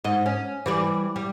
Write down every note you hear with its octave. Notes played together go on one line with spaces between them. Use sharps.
G#2 D#5
C#4
E3 G3 D5
G3